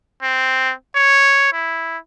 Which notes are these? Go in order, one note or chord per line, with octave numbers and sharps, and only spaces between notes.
C4
C#5
E4